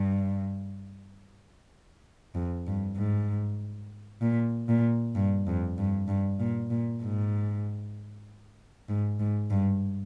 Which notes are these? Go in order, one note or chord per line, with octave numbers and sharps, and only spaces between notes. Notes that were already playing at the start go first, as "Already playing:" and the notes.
Already playing: G2
F2
G2
G#2
A#2
A#2
G2
F2
G2
G2
A#2
A#2
G#2
G#2
G#2
G2